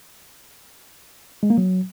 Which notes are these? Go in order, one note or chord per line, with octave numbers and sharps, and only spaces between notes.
G#3
A#3
F#3